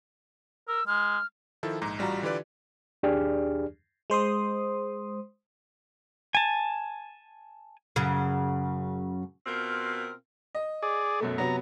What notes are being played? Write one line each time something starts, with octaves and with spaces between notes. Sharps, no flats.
A#4 E6
G#3 F6
D#3 F3 E4 A4
A#1 G#2 A#5
A1 G3 F4 F#4 A#5
D3 E3 F4 G4 B4 D5
D#2 D4 G4 G#4 D5 F6
G#3 C5 C6 D#6
G#5 A5
F#2 C#3
B2 C4 F4 A#4
D#5
G#4 D5
F#2 B2 A3
C3 F#3 B3 A#5